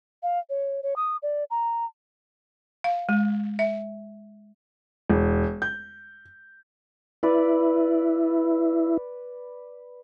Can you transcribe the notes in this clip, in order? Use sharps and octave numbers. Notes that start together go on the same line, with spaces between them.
F5
C#5
C#5
D#6
D5
A#5
F5
G#3
E5
E1
G6
E4 B4 D5